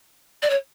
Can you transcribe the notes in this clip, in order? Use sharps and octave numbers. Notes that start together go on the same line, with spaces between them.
D5
C#5